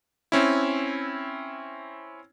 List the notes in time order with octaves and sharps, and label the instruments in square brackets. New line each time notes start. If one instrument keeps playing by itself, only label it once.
[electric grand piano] C4 C#4 E4